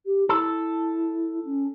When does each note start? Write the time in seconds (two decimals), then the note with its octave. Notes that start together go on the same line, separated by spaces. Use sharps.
0.06 G4
0.29 E4 A4
1.45 C#4